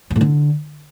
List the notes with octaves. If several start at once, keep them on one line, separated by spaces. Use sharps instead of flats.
F#2
A2
D3